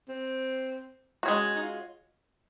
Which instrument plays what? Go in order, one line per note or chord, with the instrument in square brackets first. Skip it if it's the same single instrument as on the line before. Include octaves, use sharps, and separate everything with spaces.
[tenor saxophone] C4
[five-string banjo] G#3 C#4 F#4
[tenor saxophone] D#4
F4